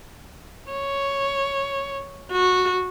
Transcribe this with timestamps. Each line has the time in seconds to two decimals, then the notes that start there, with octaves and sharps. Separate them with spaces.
0.71 C#5
2.31 F#4